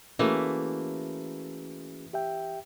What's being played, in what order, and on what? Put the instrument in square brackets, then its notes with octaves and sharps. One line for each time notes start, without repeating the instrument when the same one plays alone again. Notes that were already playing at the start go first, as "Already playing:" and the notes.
[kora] E3 A3 A#3 [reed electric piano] C#4 F#4 G#4
[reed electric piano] G4 E5 G5